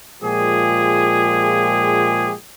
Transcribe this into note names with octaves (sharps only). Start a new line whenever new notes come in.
A#2 F3 G#3 G4 G#4